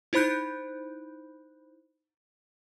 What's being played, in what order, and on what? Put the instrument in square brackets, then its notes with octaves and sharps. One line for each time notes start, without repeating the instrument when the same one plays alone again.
[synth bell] D#4 E4 C5 B5 F#6 G6